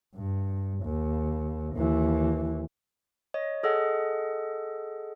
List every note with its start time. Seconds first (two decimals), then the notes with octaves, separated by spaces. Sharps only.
0.15 G2
0.84 D#2
1.76 D#2 E3
3.34 C#5 D#5
3.63 G#4 A4 D#5 F#5